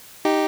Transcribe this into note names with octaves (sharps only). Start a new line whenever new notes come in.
D#4 G4